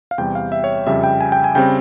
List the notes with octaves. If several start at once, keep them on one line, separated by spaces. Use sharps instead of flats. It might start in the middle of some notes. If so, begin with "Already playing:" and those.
F5
E2 C3 G3 G5
F5
E5
C#5
F2 C#3 G3 E5
G5
G#5
G5
G#5
C#3 G3 C4 G5